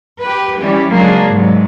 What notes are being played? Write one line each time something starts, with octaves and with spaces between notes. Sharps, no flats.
G4 B4
E3 G3 C#4 G4
C#3 F#3 G#3 A#3 D4 G#4
G#2 C3 F#3 G#3